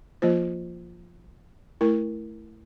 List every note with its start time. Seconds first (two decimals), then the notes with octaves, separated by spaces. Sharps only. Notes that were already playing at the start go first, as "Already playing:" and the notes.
0.22 F3 A#3 F4 C5
1.81 A3 E4 A#4